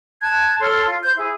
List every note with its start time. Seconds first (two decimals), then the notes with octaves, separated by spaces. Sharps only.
0.22 A5 F#6 G#6
0.60 A4 C#5 C6 F6
0.85 F4
1.02 C5 G6
1.16 E4 G#4